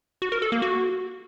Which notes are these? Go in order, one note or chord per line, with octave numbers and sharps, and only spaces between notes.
F#4
A#4
A4
A#3
F#4